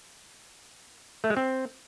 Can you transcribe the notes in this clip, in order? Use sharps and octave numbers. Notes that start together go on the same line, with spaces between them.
A3
G#3
C4